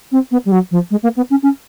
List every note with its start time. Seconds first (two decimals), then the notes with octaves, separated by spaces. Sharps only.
0.12 C4
0.31 B3
0.45 G3
0.52 F#3
0.71 F3
0.91 G#3
1.03 A#3
1.17 B3
1.30 C#4
1.43 C#4